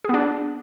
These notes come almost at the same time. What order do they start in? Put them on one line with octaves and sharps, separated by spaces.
G#4 B3 D4